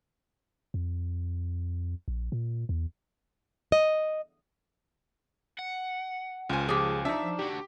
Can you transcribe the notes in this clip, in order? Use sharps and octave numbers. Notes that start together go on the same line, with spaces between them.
F2
A#1
A#2
E2
D#5
F#5
C#2 F4 C5 G#5
F3 G4 G#4
D4 D#4 E5
D3 F#4 G4